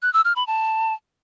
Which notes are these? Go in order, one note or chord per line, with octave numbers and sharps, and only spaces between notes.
F#6
E6
F6
B5
A5